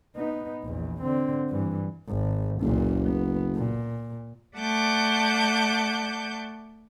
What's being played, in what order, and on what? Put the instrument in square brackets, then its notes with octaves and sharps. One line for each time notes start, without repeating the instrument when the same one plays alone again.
[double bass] B3 D#4
A#1 E2
D3 C4
G2 E3
G#1
[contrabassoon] F#1 [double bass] C#2 A#2
[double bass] B3
A#2
[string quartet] A3 D5 F#5 A5 D6 G6